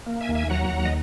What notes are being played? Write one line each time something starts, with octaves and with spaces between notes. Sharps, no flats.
A#3
E5 G#5
D#2
E5 G#5
F#3 F#5 A#5
D#2
D#5